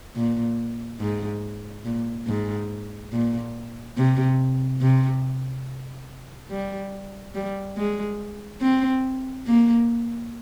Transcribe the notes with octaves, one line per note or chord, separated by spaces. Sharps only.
A#2
G#2
A#2
G#2
A#2
C3
C3
G3
G3
G#3
C4
A#3